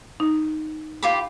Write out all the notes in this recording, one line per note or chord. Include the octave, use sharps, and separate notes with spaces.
D#4
F4 G4 B5